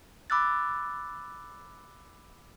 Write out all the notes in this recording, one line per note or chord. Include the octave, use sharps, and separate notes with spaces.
B5 D6 E6 F#6 A6